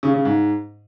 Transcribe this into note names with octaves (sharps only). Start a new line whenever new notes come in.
C#3
C#3
G#2